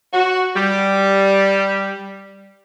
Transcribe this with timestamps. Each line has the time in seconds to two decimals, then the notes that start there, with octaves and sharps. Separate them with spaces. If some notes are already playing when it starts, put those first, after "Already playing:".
0.14 F#4
0.55 G3